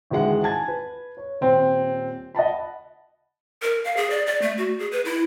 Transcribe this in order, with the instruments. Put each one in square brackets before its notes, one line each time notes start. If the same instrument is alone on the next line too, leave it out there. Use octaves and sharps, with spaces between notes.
[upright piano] A1 D2 D#3 G#3 F#5
G#5 A5 G#6
B4
C#5
D#1 C4
D#5 F#5 A5 B5
[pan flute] A#4
F5
G#4
D5
D5
A3
F#4
G#4
B4
E4